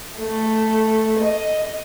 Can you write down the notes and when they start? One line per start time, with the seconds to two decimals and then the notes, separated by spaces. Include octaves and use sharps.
0.20 A3
1.19 D#5